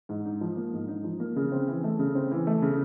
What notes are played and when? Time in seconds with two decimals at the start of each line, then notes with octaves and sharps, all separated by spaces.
0.09 G#2
0.25 D#4
0.41 F3
0.57 A#3
0.73 G#2
0.88 D#4
1.04 F3
1.20 A#3
1.36 C#3
1.52 C4
1.68 E3
1.84 A3
1.99 C#3
2.15 C4
2.32 E3
2.47 A3
2.62 C#3